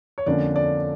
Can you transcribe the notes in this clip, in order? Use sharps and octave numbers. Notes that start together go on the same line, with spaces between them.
C#5
F2 D3 F3 A#3 C#4 D5
D5